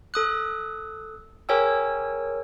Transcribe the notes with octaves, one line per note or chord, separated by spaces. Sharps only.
A4 D#6 F#6
G#4 A#4 C#5 G5 G#5 E6